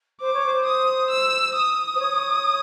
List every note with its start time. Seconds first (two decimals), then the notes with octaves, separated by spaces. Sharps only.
0.21 C5 D6
0.34 C#5
0.46 C5
0.66 D#6
1.10 E6
1.55 D#6
1.95 C5
1.99 C#5